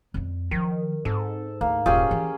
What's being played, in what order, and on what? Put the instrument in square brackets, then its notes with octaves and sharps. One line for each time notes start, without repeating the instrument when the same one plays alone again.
[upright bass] F2 G3
[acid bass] D#3 [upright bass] F3 F#3
[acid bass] G#2 [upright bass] C4 [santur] A4
[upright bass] D2 [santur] A#3
[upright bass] D#1 [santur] C#4 G4 G#4 [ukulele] F4
[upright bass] E3